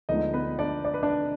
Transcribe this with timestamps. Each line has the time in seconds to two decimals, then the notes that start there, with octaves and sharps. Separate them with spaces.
0.09 D2 D3 F3 G#3 B3 D#4 D#5
0.34 B3 B4
0.59 D4 D5
0.85 D5
0.94 B4
1.03 D4 D5